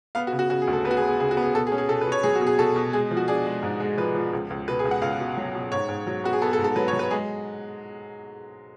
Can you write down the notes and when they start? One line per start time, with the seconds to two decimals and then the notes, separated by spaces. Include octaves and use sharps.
0.15 B3 F5
0.27 F#4
0.33 C#3
0.39 F#4
0.50 C#3 F#4
0.62 G#4
0.67 D2
0.73 A4
0.85 B3 B4
0.91 F#4
0.97 G#4
1.02 B3
1.08 G#4
1.20 C#3 G#4
1.31 F#4
1.37 B3
1.42 G#4
1.54 B2 A4
1.67 G#4
1.72 C#4
1.78 G#4
1.89 B2 A4
2.01 B4
2.07 B2 C#5
2.23 F#3 G#4
2.35 F#4
2.41 B2
2.47 G#4
2.59 B2 A4
2.76 B2
2.93 G#3 G#4
3.11 F3
3.17 F#4
3.28 D4 G#4
3.46 G#3
3.63 G#2
3.80 G#3
3.97 F3 B4
4.15 F3
4.33 C#2
4.50 C#2
4.68 B2 B4
4.79 G#4
4.85 C#2
4.91 F#5
5.02 C#2 F5
5.20 B2
5.37 F#3
5.54 B2
5.72 G#2 C#5
5.89 G#2
6.07 F#3
6.24 B3 F#4
6.33 G#4
6.42 B3 A4
6.53 A4
6.59 G#2
6.64 A4
6.76 F#3 B4
6.88 C#5
6.93 F#3
6.99 B4
7.11 G#3 G#4